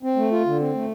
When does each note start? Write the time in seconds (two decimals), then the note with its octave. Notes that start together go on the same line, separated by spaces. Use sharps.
0.03 C4
0.16 A3
0.31 F4
0.46 D3
0.60 C4
0.74 A3